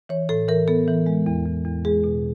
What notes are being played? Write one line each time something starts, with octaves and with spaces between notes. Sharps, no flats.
E3 C#5
A2 A4
E3 A#4
B3 A4
E3
G#3
E2
E2
E2
G#3 G#4
B2